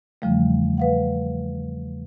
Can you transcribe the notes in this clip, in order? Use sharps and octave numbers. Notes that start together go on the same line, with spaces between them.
E2 C#3 E3 F3 G3 A3
B4 F5 F#5